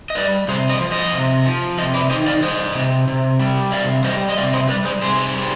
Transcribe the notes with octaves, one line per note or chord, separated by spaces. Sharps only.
D#5
G3 B4 D5
C3 G#4 C5
C5 D#5
F3
C5 D#5
C3
F3
C3 C5 D#5
B4 D5
D#3 C5 D#5
D5 F5
G3 C5 D#5
C3
C3
G3
C3 D5 F5
G3 C5 D#5
D#5
C3 D5 F5
C5 D#5
G3 B4 D5
G#4 C5
C3 G#4 C5
G3